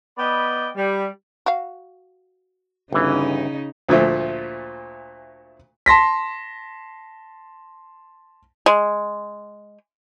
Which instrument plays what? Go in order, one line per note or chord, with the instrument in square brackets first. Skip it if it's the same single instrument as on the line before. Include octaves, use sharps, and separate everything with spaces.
[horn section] B3 D5 D#5 G5 B5
G3
[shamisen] F#4 F5
[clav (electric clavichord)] G1 E3 [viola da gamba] C#3 D#4
[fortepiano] D2 A#2 F3 A3
[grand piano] A5 C6 A#6 B6
[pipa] G#3